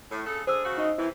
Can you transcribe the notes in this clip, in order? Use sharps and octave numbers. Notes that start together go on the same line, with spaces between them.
A2
C#3 G#4 A4
D3 G#4 C5 E6
C#3 F#4
D#4 D#5
C3 E3 E4